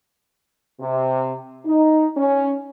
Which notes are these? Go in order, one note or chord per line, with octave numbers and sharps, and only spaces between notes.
C3
D#4
C#4